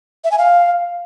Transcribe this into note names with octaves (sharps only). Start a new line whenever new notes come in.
E5
G#5
F5